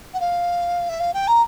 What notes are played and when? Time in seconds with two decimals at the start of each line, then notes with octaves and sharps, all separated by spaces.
0.14 F#5
0.20 F5
0.89 E5
1.00 F5
1.13 G5
1.27 A#5